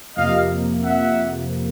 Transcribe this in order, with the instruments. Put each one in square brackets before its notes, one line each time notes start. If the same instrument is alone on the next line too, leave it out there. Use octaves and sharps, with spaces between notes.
[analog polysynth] F2 C3 F3 A#3 [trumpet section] D#5 F5
[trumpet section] E5 F#5